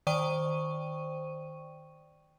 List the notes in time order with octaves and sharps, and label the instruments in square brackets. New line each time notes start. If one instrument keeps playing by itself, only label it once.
[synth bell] D#3 C5 D5 G5 C#6 D#7